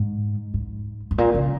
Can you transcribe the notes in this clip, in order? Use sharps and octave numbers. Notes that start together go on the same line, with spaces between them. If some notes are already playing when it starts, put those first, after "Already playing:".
Already playing: G#2
G#2
G#2
A#2
C#3